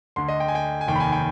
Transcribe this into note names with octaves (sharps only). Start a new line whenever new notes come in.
D2 D3 C6
D#5
G5
G#5
G5
G#5
F1 D#2 D#3 G5
B5
G#5
G5